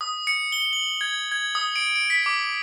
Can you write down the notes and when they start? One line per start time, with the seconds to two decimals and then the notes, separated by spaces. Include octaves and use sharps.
0.01 D#6
0.27 C#7
0.52 G7
0.73 F#7
1.01 G#6
1.32 G#6
1.55 D#6
1.76 D7
1.96 D7
2.10 B6
2.26 D6